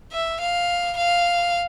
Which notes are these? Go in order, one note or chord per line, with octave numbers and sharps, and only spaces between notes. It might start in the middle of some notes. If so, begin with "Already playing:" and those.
E5
F5
F5